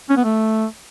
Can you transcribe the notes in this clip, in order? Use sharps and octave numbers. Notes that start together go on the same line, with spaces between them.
C#4
B3
A3